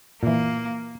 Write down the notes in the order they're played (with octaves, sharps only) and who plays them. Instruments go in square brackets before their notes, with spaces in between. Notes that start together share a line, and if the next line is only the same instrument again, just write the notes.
[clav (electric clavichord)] A#2 E3 [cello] A#3